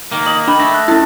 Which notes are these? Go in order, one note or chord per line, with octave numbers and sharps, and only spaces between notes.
D#3 A#3
D#4 D#5 F#7
D4 G5 B5
A3 A#6
F#6 A#6
C#4 E4 A4